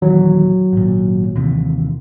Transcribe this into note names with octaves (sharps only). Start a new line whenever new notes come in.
D#1 D#2 E3 F#3
G#1 A#2
D#2 C3 E3